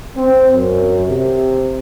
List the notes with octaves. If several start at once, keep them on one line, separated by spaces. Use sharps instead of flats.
C4
F#2
C3